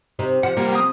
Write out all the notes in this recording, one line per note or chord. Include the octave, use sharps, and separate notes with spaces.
C3 C4 D#4
C3 F3 F#5
C3 G3 A#3
D#6